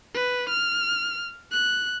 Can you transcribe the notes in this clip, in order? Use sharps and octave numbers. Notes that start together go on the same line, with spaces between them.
B4
F6
F#6